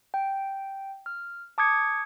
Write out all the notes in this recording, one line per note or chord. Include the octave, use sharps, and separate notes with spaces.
G5
F6
A5 D6 D#6 G#6 C#7